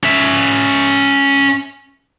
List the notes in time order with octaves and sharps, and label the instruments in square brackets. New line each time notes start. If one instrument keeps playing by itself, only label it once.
[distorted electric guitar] C#4 E5